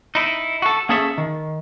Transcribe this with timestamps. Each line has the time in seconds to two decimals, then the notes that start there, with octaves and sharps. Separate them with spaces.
0.15 D#4 E4
0.62 F#4 A4
0.89 A#3 C#4 G#4 A4 C#5 E5
1.18 D#3